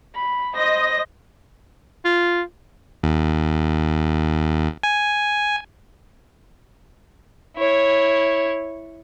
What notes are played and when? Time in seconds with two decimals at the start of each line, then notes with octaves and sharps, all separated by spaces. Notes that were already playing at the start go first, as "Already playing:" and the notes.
0.15 B5
0.57 C5 D#5 A#6
2.05 F4
3.03 D#2
4.83 G#5
7.57 E4 C#5